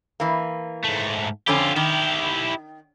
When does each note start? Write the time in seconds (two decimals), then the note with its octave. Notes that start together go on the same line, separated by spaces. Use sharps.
0.20 E3 A#3
0.84 G#2 A3
1.47 F2 D3 C#4 F4 G4
1.76 D#3 E4 G4